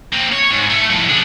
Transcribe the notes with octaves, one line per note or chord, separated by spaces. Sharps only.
A#3 C4
C#5
G#2
A3
F2 A2
D4 G#4